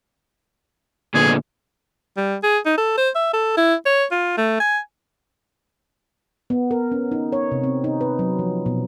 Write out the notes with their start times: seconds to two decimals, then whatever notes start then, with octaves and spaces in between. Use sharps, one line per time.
1.14 A#2 D3 B3 G#4
2.17 G3
2.43 G#4
2.66 D#4
2.77 A4
2.98 C5
3.15 E5
3.33 A4
3.57 E4
3.86 C#5
4.11 F4
4.38 A3
4.60 G#5
6.50 B3
6.71 A#4
6.92 C#4
7.12 D#4
7.32 C#5
7.52 C3
7.64 C4
7.84 D#4
8.01 B4
8.19 F#3
8.39 F3
8.66 B2